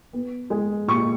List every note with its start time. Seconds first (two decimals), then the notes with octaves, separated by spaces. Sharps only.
0.13 B3
0.50 G#3
0.88 A#2 C#6